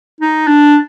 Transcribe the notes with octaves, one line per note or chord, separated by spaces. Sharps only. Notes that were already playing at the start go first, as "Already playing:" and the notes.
D#4
D4